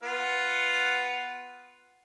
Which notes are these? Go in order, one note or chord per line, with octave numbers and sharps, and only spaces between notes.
B3 F4 F#5